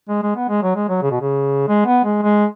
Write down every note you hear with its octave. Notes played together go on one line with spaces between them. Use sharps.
G#3
G#3
B3
G#3
F#3
G#3
F#3
C#3
B2
C#3
G#3
B3
G#3
G#3